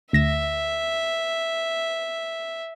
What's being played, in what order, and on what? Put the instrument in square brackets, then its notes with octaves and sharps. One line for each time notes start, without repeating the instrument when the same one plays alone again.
[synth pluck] D2 A#6 E7 [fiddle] E5